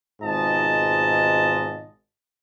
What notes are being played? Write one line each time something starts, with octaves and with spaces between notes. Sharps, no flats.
G#1 G#2 B2 F4 D#5 A5